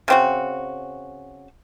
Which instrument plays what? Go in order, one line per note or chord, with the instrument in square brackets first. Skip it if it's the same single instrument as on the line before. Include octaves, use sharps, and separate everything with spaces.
[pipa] C#3 C4 F#4